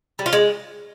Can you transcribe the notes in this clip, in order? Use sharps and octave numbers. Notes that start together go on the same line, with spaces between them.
G3
F4
G#3